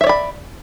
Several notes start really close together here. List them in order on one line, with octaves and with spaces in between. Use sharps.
E5 C#5 D5 B5